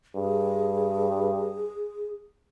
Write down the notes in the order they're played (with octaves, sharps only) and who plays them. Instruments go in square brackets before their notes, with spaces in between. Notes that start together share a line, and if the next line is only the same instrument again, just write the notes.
[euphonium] G2 [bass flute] G#4